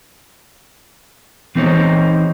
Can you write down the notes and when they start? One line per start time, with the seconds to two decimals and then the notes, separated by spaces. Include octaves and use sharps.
1.55 E3 C4 D#4 C5 C#5